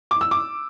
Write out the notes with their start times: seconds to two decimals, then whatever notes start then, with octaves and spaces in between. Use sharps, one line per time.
0.11 D6
0.21 E6
0.31 D6